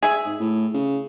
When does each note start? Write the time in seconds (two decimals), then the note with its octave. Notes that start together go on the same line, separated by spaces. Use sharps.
0.03 G#4 E5
0.25 G#2
0.40 A2
0.74 C#3